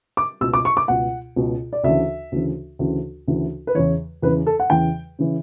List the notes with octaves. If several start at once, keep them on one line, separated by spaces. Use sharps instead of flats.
D6
C#2 B2 E6
D6
C#6
D6
C#2 B2 F#5
C#2 B2
D5
D2 C#3 E3 E5
D2 C#3 E3
D2 C#3 E3
D2 C#3 E3
B4
E2 C#3 E3 C#5
E2 C#3 E3 B4
A4
F#5
E2 C#3 E3 G5
C#3 E3